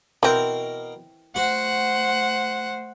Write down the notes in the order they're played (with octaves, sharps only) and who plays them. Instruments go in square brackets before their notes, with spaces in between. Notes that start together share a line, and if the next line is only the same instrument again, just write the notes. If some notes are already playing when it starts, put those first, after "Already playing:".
[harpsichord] B2 A#4 [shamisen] E3 C4
[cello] A3 C5 [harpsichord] F#4 [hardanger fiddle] F#5